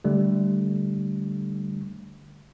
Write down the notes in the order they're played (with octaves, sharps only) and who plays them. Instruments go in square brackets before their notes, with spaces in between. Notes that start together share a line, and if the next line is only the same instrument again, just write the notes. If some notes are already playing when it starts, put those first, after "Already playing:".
[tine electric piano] D3 G3 A3